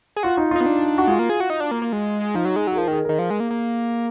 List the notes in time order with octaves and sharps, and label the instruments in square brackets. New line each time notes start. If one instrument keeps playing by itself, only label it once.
[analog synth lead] G#4
[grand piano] F4 [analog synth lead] F#4
[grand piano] D#4
[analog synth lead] D#4 [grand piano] F4
[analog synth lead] B3
D4
D4
[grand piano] F#4
[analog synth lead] G#3 [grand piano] F4
[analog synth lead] A#3
G#4
F#4
D#4
D4
A#3
A#3
G#3
[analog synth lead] F3 [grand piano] D#4
[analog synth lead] F#3
G#3
[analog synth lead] F#3 [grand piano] G#4
[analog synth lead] F3 [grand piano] A#4
[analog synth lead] D#3 [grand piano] G#4
[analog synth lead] D#3 [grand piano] A#4
[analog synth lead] F3
G#3
A#3
A#3